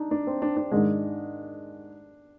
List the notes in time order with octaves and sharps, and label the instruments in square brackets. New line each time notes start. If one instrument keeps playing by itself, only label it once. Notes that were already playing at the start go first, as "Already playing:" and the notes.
Already playing: [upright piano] D4 D#4
D4
C4
D4
D4
[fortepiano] G#2 D#3 G#3 [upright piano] D4